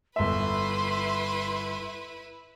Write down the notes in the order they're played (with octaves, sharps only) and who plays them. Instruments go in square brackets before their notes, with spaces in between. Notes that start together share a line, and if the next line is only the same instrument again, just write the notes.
[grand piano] G1 E5 [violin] E4 B4 [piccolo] C6